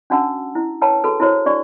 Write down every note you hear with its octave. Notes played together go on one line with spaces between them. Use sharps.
C#4 D4 F#4 F#5 A5 E6
E4
A#4 B4 C#5 G5 A5 A#5
F#4 G#4 A4 B4
E4 F#4 A#4 C5 C#5
D4 F#4 D5 C#6